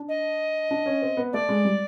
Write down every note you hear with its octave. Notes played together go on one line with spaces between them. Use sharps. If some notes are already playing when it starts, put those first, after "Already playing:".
Already playing: D4
D#5
D4
C#4
C4
B3
A3 D5
G#3
G3